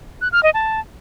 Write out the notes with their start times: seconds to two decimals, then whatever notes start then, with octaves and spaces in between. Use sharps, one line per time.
0.21 F#6
0.32 F6
0.43 D#5
0.54 A5